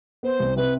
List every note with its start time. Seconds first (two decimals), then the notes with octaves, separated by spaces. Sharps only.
0.23 B3 C5
0.40 C2
0.57 C3 B4